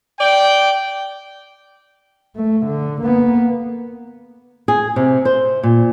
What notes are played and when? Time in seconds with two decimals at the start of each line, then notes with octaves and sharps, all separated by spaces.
0.20 D5 G5
2.36 A3
2.66 D3
3.02 A#3 B3
4.68 G#4
4.96 C3
5.25 C5
5.63 A#2